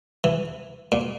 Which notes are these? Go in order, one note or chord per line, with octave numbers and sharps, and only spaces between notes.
E3
A#2